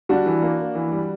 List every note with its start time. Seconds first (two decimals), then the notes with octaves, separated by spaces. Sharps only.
0.09 G3 D4 F#4
0.26 E3
0.42 A#3
0.59 A#3
0.75 E3
0.92 G3